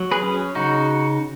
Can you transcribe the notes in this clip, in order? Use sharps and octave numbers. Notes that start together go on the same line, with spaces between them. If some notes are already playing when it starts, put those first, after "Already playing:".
Already playing: F#3
G#4 B4
C#4
C#3 D#4 F#4